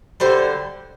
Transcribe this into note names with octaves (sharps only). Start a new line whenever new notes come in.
D3 G3 C5